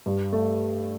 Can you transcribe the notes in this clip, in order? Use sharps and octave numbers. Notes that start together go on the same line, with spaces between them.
G2
A3